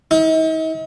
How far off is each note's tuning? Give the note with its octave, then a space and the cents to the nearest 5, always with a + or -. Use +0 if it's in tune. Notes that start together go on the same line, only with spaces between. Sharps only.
D#4 +45